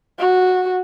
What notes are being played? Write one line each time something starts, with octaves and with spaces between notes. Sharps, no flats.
F#4